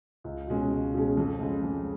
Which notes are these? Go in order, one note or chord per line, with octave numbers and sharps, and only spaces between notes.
C#2
B2 G#3 C#4 G#4
C#2
B2 G#3 C#4 G#4
F2
C#3 G#3
F2